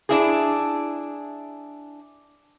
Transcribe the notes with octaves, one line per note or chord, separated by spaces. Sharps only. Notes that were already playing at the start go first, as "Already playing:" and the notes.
D4 E4 G#4